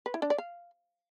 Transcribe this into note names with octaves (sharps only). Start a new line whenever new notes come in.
B4
E4
D4
D5
F5